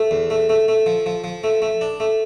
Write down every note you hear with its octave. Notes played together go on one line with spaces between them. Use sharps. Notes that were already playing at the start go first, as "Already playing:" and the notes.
Already playing: A3
E2
A3
A3
A3
F3
F3
F3
A3
A3
D4
A3